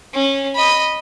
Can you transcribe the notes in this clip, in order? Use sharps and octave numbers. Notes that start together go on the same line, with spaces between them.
C#4
D#5 B5